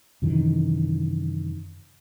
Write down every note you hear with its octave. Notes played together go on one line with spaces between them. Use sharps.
F#2 C3 D#3 E3